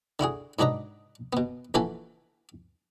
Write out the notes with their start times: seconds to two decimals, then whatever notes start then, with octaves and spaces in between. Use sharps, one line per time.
0.19 D3 E4 F#4 G#4
0.59 G#2 F#3 D4 B4 D#5 A#5
1.33 B2 B3
1.74 A#1 E3 F#4 A4 B4 G#5